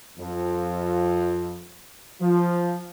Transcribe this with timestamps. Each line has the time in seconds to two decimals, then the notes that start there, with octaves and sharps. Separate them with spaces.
0.19 F2
2.20 F3